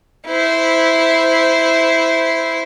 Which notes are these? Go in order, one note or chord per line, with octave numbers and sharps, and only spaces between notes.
E4 C5